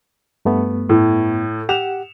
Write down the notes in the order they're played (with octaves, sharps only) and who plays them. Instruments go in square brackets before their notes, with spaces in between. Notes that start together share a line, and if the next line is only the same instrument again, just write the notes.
[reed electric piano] G2 A3 B3
[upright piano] A2
[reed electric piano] G4 F#5 [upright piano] E7 F7